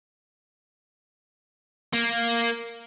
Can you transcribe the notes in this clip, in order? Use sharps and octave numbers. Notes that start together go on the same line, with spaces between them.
A#3